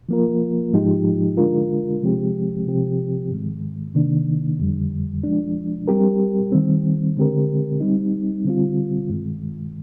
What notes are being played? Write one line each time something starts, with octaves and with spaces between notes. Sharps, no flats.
F3 A#3 F4 A#4
G#2 F3 G#3 D#4 G4
D3 G#3 D4 F4 A#4
C3 F3 G#3 C4 G4
C3 F3 C4 G4
G#2 D#3 G#3
C3 D#3 A#3 D4
F2 D3 G3
F3 G#3 D4
G3 C4 G4 A#4
D#3 G3 C4
D3 G#3 C4 G4 A#4
G3 C4 D#4
D3 G3 C4 F4
G2 D#3 G#3